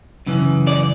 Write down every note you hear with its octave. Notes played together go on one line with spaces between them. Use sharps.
F#2 C#3 E3
D5